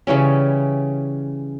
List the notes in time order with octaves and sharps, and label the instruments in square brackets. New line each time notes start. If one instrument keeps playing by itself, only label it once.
[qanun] C#3 E3 G3 C#4